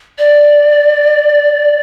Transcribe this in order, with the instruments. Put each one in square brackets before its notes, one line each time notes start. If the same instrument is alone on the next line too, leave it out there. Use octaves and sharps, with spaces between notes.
[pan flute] D5